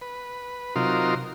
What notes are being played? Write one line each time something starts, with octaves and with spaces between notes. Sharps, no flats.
B4
C3 F#3 D#4 F4 A#4 C6